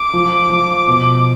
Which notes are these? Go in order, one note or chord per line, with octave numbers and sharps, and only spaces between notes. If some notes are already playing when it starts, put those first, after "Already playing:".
Already playing: D6
F3
F3
B2